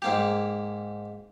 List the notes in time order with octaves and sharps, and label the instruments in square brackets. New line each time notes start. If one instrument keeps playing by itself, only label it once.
[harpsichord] G#2 A#3 G4